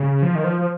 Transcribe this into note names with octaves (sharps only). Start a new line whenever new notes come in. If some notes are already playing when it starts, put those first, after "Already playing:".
Already playing: C#3
F3
D#3
F3
F3